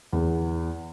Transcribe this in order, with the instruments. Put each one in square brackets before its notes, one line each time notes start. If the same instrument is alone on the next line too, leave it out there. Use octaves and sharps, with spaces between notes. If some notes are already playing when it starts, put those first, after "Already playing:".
[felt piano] E2